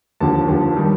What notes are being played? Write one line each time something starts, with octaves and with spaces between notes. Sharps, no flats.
D#2 D3 F3 A5
D#2 D3 F3
D#3 G3